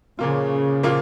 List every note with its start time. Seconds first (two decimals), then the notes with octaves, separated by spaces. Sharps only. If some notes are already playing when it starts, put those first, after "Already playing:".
0.18 A#2 C#3 F3 A#3 F4
0.83 A#2 F3 A#3 F4